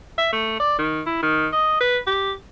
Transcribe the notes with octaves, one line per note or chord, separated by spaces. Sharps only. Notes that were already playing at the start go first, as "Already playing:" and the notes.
E5
A3
D5
D#3
E4
D#3
D#5
B4
G4